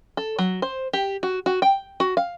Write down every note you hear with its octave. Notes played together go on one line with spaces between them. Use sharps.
A4
F#3
C5
G4
F#4
F#4
G5
F#4
F5